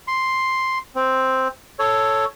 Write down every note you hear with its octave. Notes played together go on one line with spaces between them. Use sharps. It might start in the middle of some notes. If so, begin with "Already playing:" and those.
C6
C4
A4 C#5